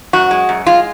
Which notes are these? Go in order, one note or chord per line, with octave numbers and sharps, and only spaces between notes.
F#2 F#4
G#3
F#2
G#3 F4